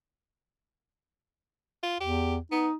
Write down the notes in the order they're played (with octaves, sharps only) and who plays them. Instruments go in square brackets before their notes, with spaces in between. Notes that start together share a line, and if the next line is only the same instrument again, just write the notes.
[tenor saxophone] F4
[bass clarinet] E2 [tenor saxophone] G4
[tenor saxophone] B3 [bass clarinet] D#4